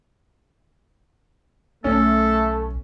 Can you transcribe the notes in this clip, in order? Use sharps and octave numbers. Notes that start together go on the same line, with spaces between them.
B1 A3 C#4 A4